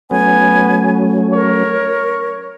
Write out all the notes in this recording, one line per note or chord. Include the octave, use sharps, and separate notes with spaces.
F#3 A3 B3 C#4 G#5
A#4 C#5